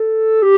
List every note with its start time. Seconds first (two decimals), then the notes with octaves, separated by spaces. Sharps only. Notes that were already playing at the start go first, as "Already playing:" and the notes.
Already playing: A4
0.42 G4